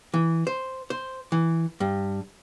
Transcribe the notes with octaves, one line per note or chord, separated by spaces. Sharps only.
E3
C5
C5
E3
G2